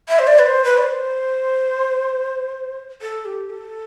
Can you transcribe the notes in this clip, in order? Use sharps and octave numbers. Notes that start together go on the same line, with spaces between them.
E5
C5
D5
B4
C5
B4
D5
C5
A4
G4
A4